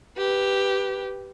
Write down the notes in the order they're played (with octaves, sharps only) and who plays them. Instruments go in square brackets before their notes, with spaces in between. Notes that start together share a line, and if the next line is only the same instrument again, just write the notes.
[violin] G4 B4